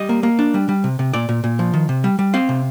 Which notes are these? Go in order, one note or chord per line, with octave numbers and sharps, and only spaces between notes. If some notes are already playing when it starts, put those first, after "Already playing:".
Already playing: G3 D#5
A#3
A#3
D4
G3
G3
C3
C3
A#2 D5
A#2
A#2
F3
D#3
C3
G3
G3
C4 F5
C3